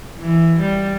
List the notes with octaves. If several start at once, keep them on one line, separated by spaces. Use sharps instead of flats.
E3
G3